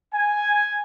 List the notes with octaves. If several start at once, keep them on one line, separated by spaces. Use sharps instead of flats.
G#5